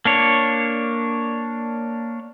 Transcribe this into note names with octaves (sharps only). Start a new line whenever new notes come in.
A#3 D4 C#5